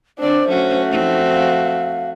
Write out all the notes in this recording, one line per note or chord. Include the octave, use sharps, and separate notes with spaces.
D3 C4 D4 C5 D5
F#3 A3 C#4 F#4
F2 C4 D#4
F5